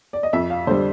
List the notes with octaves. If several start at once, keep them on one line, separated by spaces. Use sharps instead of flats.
D5
D#5
F2 E5
F5
D3 G3 C5